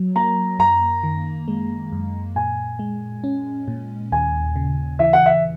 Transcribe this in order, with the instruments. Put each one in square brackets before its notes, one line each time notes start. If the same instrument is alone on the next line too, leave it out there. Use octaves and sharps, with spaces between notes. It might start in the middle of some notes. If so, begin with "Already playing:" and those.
Already playing: [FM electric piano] F#3
[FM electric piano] A#3 [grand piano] A#5
[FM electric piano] F#2 [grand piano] A#5
[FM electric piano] D#3
G#3
F#2
[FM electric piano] A#2 [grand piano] G#5
[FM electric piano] G#3
C#4
A#2
[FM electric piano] D#2 [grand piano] G#5
[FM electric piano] C#3
[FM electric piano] E3 [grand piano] E5
[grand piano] F#5
E5